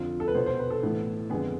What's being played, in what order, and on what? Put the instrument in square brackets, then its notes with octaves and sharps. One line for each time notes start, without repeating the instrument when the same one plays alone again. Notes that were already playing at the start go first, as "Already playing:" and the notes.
Already playing: [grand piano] F2 D3 F3 F4
A4
B4
B2 B3 C5
C5
B4
A4
A2 E3 B3
F2 D3 G#3 B3 G#4